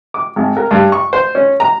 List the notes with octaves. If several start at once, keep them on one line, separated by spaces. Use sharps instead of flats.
D6
G#1
A#4
G2
C#6
C5
C#4
A#5